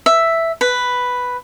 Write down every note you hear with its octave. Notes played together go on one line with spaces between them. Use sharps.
E5
B4